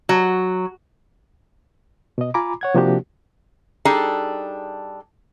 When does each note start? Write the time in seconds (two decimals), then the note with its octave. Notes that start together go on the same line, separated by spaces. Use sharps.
0.09 F#3
2.18 B2 D#5
2.34 F4 G#5 A#5 B5 D6
2.61 C#5 F#5 G#6
2.74 C3 F3 A#3 D4 F#4 G4
3.85 G3 D4 D#4 G#4 A4